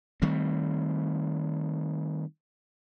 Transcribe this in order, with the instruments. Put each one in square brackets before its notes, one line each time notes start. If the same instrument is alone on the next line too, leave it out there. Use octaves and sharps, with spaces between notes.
[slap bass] D#3 G3 A3 C4